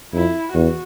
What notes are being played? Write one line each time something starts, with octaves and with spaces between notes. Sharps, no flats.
F2 E4
E2 F#4